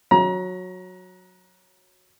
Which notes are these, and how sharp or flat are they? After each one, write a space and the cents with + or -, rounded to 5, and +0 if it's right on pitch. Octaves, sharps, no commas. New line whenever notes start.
F#3 -15 A#5 +30